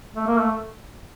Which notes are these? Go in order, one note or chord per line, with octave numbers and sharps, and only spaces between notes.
A3
A#3
A3